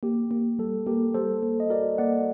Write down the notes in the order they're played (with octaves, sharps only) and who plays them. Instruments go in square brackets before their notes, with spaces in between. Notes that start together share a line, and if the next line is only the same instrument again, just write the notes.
[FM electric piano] A#3 [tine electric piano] G4
[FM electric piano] A#3
[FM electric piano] G3 [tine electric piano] A4
[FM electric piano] A#3 [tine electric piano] G4 A#4
[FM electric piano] G3 [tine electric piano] A4 C5
[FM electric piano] A#3
[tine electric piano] D#5
[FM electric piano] F#4 [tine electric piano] A#4 D5
[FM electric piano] A#3 [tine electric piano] D5 F#5